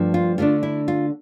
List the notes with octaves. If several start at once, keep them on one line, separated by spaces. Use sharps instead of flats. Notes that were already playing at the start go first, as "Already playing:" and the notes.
Already playing: G2 F3 A3 D4
F4
D3 A3 D4 F4
E4
F4